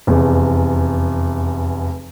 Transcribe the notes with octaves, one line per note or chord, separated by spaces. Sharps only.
F1 E2